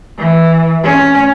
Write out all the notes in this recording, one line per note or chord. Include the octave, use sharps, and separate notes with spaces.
E3
C#4